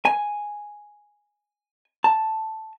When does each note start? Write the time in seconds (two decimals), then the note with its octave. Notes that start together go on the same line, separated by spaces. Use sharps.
0.05 G#5
2.04 A5